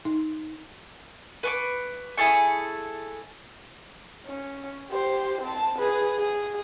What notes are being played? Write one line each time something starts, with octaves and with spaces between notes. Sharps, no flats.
D#4
B4 C#6 D6
E4 G#4 A4 C#6
C#4
G4 C5
C4 A5
G#4 B4
G#4